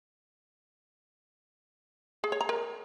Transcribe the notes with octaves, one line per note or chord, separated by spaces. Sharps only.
G#4
C#5
A#5
A#4